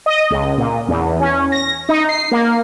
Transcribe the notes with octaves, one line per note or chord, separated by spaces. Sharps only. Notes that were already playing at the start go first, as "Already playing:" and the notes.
D#5
C#2
A#2
E2
C#4
A#6
D#4
C7
A#3